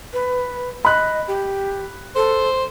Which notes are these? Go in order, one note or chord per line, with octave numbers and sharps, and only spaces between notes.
B4
D#5 B5 F#6
G4
A4 C5